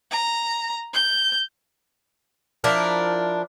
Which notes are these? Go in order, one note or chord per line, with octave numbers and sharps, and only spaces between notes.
A#5
G6
F3 D4 E4 A#4